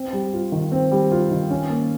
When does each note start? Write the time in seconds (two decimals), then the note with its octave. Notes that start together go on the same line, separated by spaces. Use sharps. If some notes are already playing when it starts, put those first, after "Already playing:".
Already playing: C4
0.13 G3
0.33 F4
0.52 D#3
0.72 C4
0.91 G3
1.12 F4
1.31 D#3
1.50 C#4
1.70 A#3